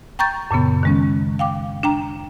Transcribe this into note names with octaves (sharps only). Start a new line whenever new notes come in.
G5 A#5 C#6 G6 A6
F#2 A#2 C#3 B3
D#3 G#3 C#4
F5 G5 D6
D4 G5 A#5